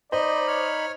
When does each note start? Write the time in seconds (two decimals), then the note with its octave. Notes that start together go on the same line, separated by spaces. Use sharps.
0.12 D#4 C5 D5 D#5 B5
0.47 C#5 F6